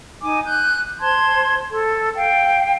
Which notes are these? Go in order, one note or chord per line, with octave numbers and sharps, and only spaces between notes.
D#4 G#5 D6
F#6 G6
C5 A5 C6 G#6
A4
F5 G5